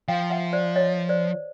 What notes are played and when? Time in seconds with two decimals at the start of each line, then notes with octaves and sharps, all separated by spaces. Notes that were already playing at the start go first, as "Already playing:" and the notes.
0.08 F3 F5 G5
0.30 E5 F#5
0.53 C5 D5
0.76 C#5 D#5
1.09 C5 D5